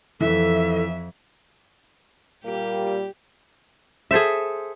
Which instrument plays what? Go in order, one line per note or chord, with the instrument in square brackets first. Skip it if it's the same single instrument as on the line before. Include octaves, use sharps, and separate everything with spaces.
[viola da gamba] F2 [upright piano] E3 [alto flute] A4 [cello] E5
[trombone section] A#2 G3 [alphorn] A#3 [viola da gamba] G4
[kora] G#4 A4 C5 E5